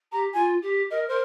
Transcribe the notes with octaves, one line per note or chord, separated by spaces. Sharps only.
G4 A#5
F4 G#5
G4
A#4 D#5
A#4 C5